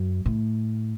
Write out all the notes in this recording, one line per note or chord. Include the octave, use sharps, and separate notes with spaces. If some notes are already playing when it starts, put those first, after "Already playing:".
Already playing: F#2
A2